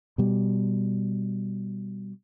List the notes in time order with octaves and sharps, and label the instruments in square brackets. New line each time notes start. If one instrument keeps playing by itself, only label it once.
[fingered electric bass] B2 G3